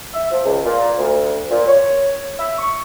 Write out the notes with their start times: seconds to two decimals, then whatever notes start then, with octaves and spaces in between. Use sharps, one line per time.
0.14 E5
0.32 F3
0.44 C#2
0.65 A#2
0.97 D2
1.50 A#2
1.67 C#5
2.39 E5
2.58 C#6